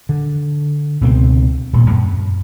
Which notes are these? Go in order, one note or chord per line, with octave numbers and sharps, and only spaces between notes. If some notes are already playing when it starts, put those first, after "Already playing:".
D3
C#2 B2 B3 C4
D#1 G2 A#2
F#2